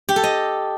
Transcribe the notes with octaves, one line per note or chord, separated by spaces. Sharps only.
G4
A4
D#5